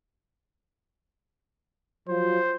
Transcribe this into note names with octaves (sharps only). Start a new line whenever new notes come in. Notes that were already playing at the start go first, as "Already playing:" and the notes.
F3 F#3 C5